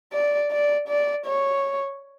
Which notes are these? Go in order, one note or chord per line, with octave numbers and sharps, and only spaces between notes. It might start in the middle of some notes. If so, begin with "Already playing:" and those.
D5
D5
D5
C#5